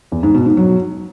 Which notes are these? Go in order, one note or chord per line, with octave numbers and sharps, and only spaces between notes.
E2
G#2
B2
G#2
F#3